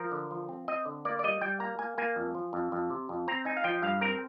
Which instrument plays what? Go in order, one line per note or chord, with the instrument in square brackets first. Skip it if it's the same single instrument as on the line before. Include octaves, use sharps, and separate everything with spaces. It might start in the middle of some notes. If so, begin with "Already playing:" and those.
Already playing: [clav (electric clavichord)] F3 A#4
D3
F3
C4
C4 D#5
D3
A#3 D5
D5
G3 D#5
G3 G5
A#3 A#5
A#3 G#5
A#3 G#5
F2
F3
F2
F2
C3
F2
C4 A#5
D#4 G#5
F5
F3 G5
G2 F5
C4 A#4